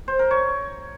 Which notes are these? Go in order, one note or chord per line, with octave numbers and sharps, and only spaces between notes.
C5
A#4
C#5